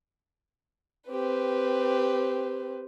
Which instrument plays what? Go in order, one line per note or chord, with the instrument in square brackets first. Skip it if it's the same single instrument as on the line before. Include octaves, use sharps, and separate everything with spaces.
[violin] C4 B4 [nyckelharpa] G4